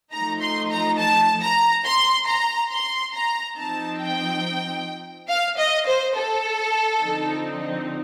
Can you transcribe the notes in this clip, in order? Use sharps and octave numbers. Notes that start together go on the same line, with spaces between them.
F3 A3 D#4 A#5
C6
A#5
A5
A#5
C6
A#5
C6
A#5
F3 C4 D#4 A5
G5
F5
D#5
C5
A4
D3 F3 C4 D#4